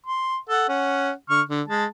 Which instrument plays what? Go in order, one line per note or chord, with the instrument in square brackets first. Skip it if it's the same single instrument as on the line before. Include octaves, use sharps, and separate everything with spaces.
[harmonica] C6
A4 F#5
C#4 F#5
D3 C#6 F6
D3
G#3 A5